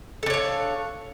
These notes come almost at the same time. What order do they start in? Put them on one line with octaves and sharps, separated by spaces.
A4 D4 C#5 F5